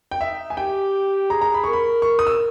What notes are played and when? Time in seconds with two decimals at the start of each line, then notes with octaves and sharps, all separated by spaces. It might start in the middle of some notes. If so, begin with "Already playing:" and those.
0.11 G5
0.21 D#4 E5
0.50 G#5
0.57 G4 G5
1.30 G#4 A#5
1.41 A#5
1.54 B5
1.64 A#4 C#6
1.73 B5
2.02 C#6
2.19 D#6
2.27 E6